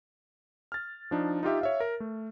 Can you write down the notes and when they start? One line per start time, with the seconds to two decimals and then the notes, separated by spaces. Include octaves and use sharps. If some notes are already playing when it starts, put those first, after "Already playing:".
0.72 F6 A6
1.11 F3 D4 D#4
1.43 D#4 F4 G4 E5
1.61 C#5 E5 F5
1.80 A#4
2.00 A3